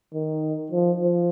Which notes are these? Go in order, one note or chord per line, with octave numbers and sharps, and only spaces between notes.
D#3
F3
F3